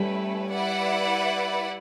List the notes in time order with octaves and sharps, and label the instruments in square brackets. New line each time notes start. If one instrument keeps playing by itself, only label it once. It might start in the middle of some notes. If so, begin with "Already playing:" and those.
Already playing: [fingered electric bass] G3 [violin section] A3 C#4 E4 B4
[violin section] E4 B4 D5 F#5